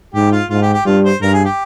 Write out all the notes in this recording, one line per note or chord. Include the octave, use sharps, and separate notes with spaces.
G#2 G4
F4
G#2 F4
G4
G4
G2 F4
C5
G2 A#4
G#4
G4